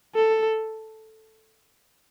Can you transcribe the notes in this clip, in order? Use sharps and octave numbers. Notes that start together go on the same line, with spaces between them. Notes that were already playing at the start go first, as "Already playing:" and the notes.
A4